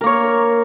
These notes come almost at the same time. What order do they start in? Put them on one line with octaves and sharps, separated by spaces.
A#4 A#3 C#5